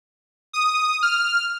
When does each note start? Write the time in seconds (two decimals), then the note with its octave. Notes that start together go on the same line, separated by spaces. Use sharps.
0.53 D#6
1.02 F6